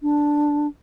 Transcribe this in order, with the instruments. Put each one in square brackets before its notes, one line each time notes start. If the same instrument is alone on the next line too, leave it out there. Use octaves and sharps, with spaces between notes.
[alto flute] D4